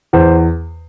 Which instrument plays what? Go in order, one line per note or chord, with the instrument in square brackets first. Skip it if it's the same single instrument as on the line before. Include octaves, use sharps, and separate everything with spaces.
[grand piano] E2 C5